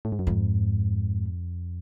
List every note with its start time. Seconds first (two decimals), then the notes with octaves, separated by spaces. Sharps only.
0.05 A2
0.12 G#2
0.19 F#2
0.27 F2 G#2